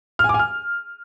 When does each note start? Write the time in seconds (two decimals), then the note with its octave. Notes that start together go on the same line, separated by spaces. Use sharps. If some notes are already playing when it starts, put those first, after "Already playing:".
0.19 F6
0.24 G#5
0.29 D6
0.34 G#5
0.39 F6